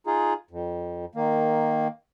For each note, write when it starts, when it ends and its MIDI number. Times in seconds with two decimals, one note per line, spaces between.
0.07 0.33 63
0.07 0.33 65
0.07 0.33 68
0.51 1.05 41
1.15 1.88 51
1.15 1.88 58